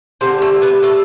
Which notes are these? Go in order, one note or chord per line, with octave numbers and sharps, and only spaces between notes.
D3 G3 C4 C5
A3 A4
B3 B4
A3 A4